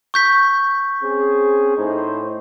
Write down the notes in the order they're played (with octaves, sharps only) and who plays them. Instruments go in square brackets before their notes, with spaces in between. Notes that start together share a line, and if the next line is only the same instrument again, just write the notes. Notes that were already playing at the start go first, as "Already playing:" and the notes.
[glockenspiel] C#6 G6 B6
[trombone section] C4 C#4 G#4
A2 D#4 C5